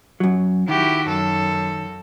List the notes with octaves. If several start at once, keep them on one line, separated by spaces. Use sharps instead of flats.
F#2 F#3
D#3 E4 F#4 G4
F#2 A4